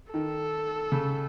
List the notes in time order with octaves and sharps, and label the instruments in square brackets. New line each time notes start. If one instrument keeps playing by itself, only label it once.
[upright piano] D#3 [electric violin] A4
[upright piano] C#3